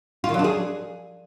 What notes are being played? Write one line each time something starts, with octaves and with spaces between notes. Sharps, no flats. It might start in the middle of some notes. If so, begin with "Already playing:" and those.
F4
D#3
F#3
D4
G#4